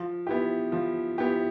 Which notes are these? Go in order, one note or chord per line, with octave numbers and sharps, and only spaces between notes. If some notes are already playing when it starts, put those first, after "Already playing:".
Already playing: F3
B3 E4 G4
F3
B3 E4 G4